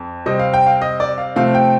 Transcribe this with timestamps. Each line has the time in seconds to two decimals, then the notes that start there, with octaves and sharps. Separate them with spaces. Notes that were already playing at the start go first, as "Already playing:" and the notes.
Already playing: F2
0.26 C3 G3 C4 D#5
0.39 F5
0.54 G5
0.67 F5
0.82 D#5
1.00 D5
1.18 F5
1.36 C3 F3 A3 C4 F5
1.55 G5